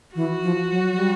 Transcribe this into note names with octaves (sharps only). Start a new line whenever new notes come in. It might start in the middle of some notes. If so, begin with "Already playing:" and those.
E3 F#4
F3
F#3
F#3
G3